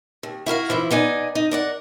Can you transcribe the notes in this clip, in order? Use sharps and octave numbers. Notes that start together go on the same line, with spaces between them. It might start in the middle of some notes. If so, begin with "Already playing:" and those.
D#2
E4 F#4 A#4 F5
E3 F3 E4
B3 D#4 D5 G#5
D#4
A#4 D5 F#5